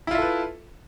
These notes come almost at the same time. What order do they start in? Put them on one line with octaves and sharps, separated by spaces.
E4 F4 E5 A4 B4